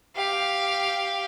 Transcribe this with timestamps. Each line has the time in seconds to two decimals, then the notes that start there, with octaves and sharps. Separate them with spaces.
0.16 G4 F5